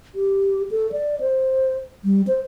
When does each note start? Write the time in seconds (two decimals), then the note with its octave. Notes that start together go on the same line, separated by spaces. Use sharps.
0.15 G4
0.71 A4
0.92 D5
1.20 C5
2.04 G3
2.27 C5